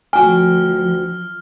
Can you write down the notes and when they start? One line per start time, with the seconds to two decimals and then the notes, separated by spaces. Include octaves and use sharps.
0.13 D2 F3 F#4 G5 G#5 F6